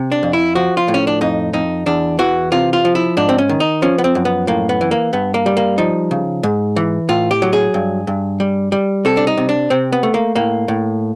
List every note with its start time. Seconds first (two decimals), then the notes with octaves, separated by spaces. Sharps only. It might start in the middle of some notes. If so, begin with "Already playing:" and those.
Already playing: C3
0.12 D4
0.23 F2
0.33 E4
0.55 F3 F#4
0.77 F4
0.88 A2
0.94 C#4
1.07 D4
1.21 F2 D#4
1.53 F2 D#4
1.86 E2 D4
2.19 E3 F#4
2.52 C3 F4
2.73 F4
2.85 F3
2.95 E4
3.17 G#2 D4
3.29 C4
3.38 C#4
3.49 D#3
3.60 D#4
3.82 F3 C#4
3.98 B3
4.04 C4
4.15 F#2
4.25 B3
4.47 A2 A#3
4.69 B3
4.81 E3
4.91 A#3
5.13 G2 B3
5.34 A#3
5.46 G3
5.57 A#3
5.78 F3 D#4
6.11 C#3
6.43 G#2
6.76 E3
7.09 A2 F4
7.31 G4
7.42 F#3
7.53 G#4
7.74 G2
8.07 G2
8.40 G3
8.72 G3
9.05 C3 A4
9.17 D4
9.27 D#4
9.37 C3
9.49 D4
9.70 C3 C4
9.92 B3
10.03 A3
10.14 A#3
10.36 A2 A#3
10.68 A2